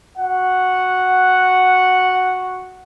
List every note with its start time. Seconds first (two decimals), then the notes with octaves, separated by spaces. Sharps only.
0.18 F#4 F#5